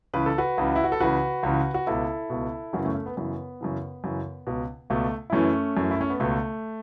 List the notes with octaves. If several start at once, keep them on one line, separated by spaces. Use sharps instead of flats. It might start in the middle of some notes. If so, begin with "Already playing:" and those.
C#2 C#3 E3 B4
A4
F#4 B4
C#2 C#3 E3
E4
F#4
A4
C#2 C#3 E3 F#4 B4
C#2 C#3 E3
F#4
C#2 B2 E4 A4
C#2 B2
F#2 C#3 E3 C#4 F#4
A3 C#4
A3
B3
F#2 C#3 E3 B3
F#2 C#3 E3
F#2 C#3 E3
C#2 B2
C#2 B2 A3
E4
F#2 E3 A3 C#4
F#2 E3
E4
C#4
B3
C#2 B2 A3